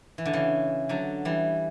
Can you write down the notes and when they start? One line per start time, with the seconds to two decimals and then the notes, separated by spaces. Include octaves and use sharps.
0.18 E3
0.25 D3
0.33 C#3 E3
0.89 D3 F#3
1.25 E3 G3